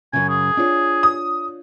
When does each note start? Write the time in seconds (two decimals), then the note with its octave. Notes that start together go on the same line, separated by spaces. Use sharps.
0.13 F#2 C#3 G#5
0.29 G#4
0.57 D4 F4 C#5
1.03 D#6